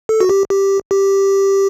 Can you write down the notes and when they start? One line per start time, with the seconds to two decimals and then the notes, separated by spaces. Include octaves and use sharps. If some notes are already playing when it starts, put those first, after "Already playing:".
0.09 A4
0.21 F#4
0.29 G4
0.50 G4
0.91 G4